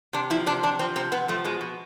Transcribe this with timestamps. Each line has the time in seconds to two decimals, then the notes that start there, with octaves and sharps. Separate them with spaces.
0.13 C3 D4
0.30 F3 E4
0.46 C3 D4
0.63 C3 D4
0.79 F3 C4
0.96 C3 C4
1.12 C3 B3
1.28 F3 A3
1.44 B2 G#3
1.61 B2